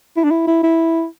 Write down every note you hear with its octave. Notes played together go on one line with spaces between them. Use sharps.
E4
D4
E4
E4
E4